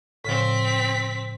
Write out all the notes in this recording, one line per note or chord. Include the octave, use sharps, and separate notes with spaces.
A2 C#3 F3 C4 B6